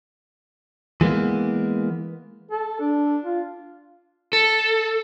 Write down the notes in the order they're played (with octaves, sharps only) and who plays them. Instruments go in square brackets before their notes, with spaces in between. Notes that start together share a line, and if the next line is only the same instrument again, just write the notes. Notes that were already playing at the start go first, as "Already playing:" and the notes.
[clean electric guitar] E3 G#3 A#3 B3
[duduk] A4
D4
F4
[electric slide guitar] A4